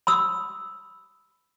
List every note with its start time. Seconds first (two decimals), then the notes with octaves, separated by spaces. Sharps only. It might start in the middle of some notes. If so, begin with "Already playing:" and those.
0.07 B5 D#6 E6